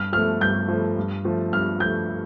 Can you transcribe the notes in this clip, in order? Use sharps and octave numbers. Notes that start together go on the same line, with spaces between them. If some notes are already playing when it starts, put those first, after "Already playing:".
Already playing: G2 F6
F3 A3 F6
G2 G6
F3 A3
G2
F3 A3
G2 F6
F3 A3 G6